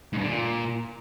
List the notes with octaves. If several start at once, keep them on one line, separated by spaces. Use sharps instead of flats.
G#2
G2
D3
A#2